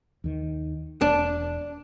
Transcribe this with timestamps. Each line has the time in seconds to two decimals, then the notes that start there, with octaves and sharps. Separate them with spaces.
0.24 D#2 D#3
1.01 E1 D4